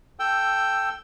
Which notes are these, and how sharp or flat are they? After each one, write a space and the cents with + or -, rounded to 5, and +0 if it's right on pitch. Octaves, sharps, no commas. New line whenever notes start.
A4 -5 G5 +0 E6 +10